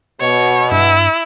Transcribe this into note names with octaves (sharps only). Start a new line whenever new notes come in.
B2 C#5
G2 E4